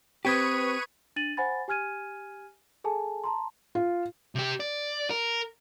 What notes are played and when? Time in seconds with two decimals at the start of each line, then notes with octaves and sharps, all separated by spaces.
0.25 C4 G4 B4 C#6 D#6 G#6 B6 D#7
1.16 D4 A6 D#7 F#7
1.37 C5 F#5 G#5 B5 A6
1.68 G4 G#5 F6 G#6 D#7
2.84 G#4 A4 G#5 A5
3.24 A5 A#5 C6
3.75 F4
4.35 C3 G4
4.60 D5
5.10 A#4